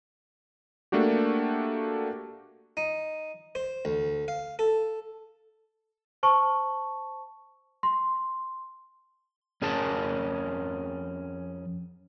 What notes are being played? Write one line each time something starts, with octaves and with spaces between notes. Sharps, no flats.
A3 A#3 D4 F#4 G4
D#4
C5
D2
F5
A4
C5 A5 C#6
C6
F2 C#4 G#4 A#4 A5